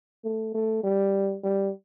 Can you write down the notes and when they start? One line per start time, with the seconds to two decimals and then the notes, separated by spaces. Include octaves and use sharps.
0.24 A3
0.54 A3
0.84 G3
1.44 G3